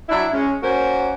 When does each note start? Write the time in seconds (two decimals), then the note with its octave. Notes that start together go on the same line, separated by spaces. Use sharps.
0.09 F#3 D4 E4
0.33 G#3 C#4
0.62 A#3 C#4 F#4 A#4 C5